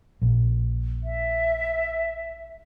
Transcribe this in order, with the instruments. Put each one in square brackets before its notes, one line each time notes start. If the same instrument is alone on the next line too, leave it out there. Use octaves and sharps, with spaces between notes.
[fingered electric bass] A#1
[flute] E5